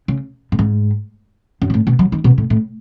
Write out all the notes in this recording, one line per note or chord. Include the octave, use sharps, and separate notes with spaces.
C#3
A2
G#2
F#2
B2
A2
B2
F#3
D#3
B2
A2
A2